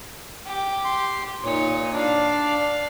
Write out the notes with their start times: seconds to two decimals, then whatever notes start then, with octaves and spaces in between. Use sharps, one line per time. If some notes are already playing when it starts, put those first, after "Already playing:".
0.46 G4
0.85 C6
1.43 A#2 D#4 C#5
1.93 D4 D5 F5